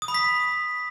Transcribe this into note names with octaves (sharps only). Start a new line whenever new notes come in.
D#6
B5
B6